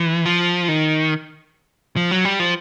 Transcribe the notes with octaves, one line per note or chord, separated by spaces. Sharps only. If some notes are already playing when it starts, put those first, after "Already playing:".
Already playing: E3
F3
D#3
F3
F#3
G3
F3